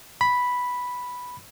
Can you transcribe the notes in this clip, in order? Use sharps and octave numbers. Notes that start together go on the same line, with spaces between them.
B5